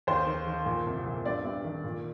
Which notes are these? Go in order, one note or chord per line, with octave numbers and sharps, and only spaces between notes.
D#2 C5
D#3
D#3
A#2
C2
A#2
G2 D5
G2
D#3
A#2